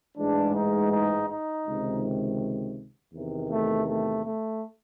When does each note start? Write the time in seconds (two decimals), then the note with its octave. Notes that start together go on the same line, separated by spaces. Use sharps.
0.18 A1 G#2 E3 G#3 D4
0.55 D#4
0.92 D#4
1.29 D#4
1.66 C#2 C3 D#3
3.14 E2 C3 D#3
3.51 A3
3.88 A3
4.25 A3